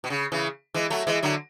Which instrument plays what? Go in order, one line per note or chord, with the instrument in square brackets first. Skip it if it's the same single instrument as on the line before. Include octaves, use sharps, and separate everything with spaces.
[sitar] B2
C#3
C#3 E3
E3 G#3
F#3 A3
E3 G#3
D3 F#3